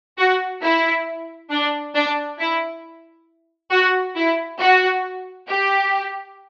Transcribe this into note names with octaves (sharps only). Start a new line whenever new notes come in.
F#4
E4
D4
D4
E4
F#4
E4
F#4
G4